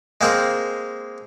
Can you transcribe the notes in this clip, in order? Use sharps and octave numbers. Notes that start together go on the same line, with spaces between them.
G#3 A#3 C4 G#4 A#4